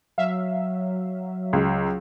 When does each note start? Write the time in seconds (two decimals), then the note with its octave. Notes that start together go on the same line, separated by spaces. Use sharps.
0.18 F#3 E5 F5
1.53 C#2